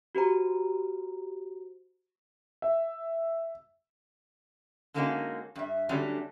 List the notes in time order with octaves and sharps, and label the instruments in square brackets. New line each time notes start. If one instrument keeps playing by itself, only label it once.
[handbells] F#4 G4 C5 A#5
[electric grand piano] E5
[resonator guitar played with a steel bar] D3 G#3 A#3 C#4 D#4 F#4
G2 E5
D3 F#3 G3 A3 C#4 D4